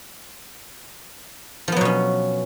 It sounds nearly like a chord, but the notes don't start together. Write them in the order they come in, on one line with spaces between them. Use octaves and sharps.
F3 B3 F#3 B2 C#4